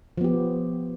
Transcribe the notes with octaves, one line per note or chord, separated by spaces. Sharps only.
F3 B3 G4